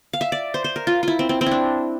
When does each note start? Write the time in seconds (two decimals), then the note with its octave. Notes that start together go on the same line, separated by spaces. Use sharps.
0.13 F5
0.21 E5
0.32 D5
0.54 C5
0.64 C5
0.76 A#4
0.87 F4
1.03 E4 F4
1.19 C4
1.29 C4
1.41 C4
1.46 D4 E4